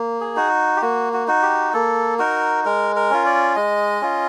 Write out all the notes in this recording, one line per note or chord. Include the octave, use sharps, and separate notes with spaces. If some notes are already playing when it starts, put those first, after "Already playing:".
Already playing: A#3
G#4
D#4 F#4
G4
A#3 F#4
F#4
D#4 F#4
G4
A#3 A4
D#4 F#4 A#4
G#3 A#4
A#4
C#4 F4
D5
G#3 D#5
C#4 F4